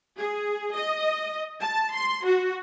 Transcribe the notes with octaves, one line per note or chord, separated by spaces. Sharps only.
G#4
D#5
A5
C6
F#4